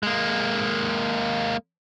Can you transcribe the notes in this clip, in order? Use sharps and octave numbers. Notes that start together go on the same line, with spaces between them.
G#3 A#3